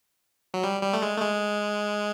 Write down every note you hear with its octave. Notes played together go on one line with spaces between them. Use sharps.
F#3
G3
G3
A3
G#3
A3
G#3